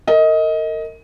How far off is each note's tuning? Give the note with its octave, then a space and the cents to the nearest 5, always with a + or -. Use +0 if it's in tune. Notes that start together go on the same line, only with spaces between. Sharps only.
A#4 -35 D#5 +20